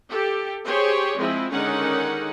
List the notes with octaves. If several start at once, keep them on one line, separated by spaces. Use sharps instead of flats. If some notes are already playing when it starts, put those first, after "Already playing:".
G4 A4
G4 G#4 C5 C#5
F3 G#3 C4 E4
D3 D#3 G#3 C#4 D#4 F#5